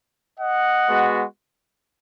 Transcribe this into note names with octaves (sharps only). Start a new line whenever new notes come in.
D#5 F#5
G#3 B3 F#4